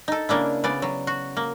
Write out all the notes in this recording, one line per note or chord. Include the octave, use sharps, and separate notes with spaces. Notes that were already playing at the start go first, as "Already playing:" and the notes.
D#4 A4
C#3 A#3 D4 E4
C#3 B3 D5
F#3
F#4
A#3